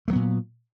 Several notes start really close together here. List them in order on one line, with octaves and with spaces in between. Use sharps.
A3 F#3 B3 A#2